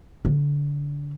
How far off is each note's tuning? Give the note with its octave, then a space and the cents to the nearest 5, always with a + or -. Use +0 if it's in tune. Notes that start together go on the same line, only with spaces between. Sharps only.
D3 -25